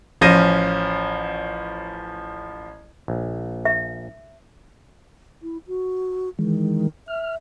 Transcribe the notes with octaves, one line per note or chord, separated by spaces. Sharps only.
A1 F3 C#4 A#6 D#7
A#1
E5
E4
F#4
D#3 E3 G#3
E5 F6